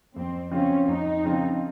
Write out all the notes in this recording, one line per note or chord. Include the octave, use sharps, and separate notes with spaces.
F2 C4
C#3 F3 C4 C#4 F4
F2 D#4
C#3 F3 C4 F4